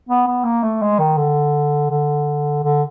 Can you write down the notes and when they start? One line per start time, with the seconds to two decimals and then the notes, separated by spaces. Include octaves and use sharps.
0.09 B3
0.27 B3
0.45 A#3
0.63 A3
0.82 G#3
0.99 D#3
1.18 D3
1.90 D3
2.64 D3